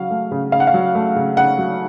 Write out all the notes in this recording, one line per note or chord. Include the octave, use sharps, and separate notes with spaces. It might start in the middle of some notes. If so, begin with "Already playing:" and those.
Already playing: C#3 F#3 F5
A3
C#3
C#3 F5
F#5
F5
F#3
A3
C#3
C#3 F#5
F#3